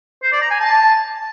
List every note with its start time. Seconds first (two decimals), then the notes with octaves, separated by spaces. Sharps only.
0.23 C5
0.32 D5
0.41 A#5
0.50 G#5
0.60 A5